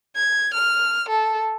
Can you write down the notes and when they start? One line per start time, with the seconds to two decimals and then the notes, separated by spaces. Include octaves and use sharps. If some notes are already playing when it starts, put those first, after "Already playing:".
0.16 G#6
0.54 F6
1.09 A4